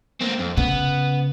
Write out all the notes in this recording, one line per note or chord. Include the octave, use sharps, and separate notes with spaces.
A#3 C4
F2
C#3 B3